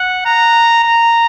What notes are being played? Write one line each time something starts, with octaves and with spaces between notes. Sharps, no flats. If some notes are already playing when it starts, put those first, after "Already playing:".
Already playing: F#5
A#5
A#5